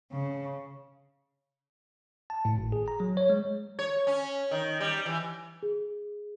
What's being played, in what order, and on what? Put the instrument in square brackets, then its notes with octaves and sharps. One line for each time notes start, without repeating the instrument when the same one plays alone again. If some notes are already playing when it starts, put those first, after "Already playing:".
[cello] C#3
[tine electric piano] A5
A2
G#1
G#4
A#5
F#3
C#5
G#3
[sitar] C#5
C#4
D#3
G3
E3
[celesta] G#4